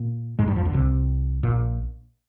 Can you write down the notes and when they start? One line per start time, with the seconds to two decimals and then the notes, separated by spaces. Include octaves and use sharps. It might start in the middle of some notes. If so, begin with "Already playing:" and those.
Already playing: A#2 A#3
0.39 G#2 G#3
0.48 G2 G3
0.56 F2 F3
0.65 D2 D3
0.73 C2 C3
1.43 A#1 A#2